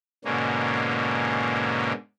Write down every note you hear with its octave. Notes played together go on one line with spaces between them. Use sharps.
G#2 B2 D3 A#3 C#4